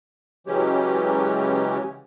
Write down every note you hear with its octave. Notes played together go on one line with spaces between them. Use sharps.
C#3 E3 F#3 G#3 C#4 G4